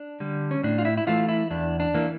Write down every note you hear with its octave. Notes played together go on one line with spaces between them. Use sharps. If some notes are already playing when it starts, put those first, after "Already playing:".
Already playing: D4
D3 G3
C#4
A2 D4
F4
E4
E4
E3 A3 F4
E4
E2 D4
D4
E3 A#3